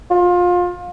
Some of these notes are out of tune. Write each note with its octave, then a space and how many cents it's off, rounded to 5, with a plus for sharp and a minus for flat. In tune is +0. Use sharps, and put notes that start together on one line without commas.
F4 +25